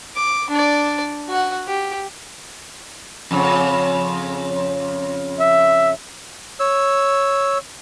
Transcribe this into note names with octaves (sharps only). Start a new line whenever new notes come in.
D6
D4 D5
F#4 F#5
G4
F2 C#3
E5
C#5 E6